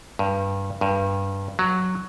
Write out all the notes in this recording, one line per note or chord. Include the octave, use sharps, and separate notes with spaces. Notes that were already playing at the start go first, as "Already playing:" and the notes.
G2
G2
F#3